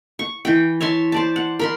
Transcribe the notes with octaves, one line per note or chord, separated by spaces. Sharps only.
C#6
E3 G5
C#5 E5 A5 C6
C5 D5 A5
F#5
A#4 B5 C6